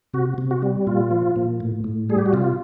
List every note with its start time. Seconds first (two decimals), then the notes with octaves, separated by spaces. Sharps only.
0.14 C3 F#4
0.38 C3
0.51 F#4
0.62 G3
0.87 A#2 F4
1.11 F3
1.36 A#2
1.60 A2
1.84 A2
2.09 G3 G#4
2.18 G4
2.26 F#4
2.33 C3 F4